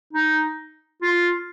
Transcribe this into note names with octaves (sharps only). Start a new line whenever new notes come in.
D#4
F4